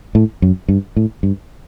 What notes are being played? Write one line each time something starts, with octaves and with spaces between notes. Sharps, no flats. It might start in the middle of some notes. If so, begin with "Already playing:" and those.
A2
F#2
G2
A2
G2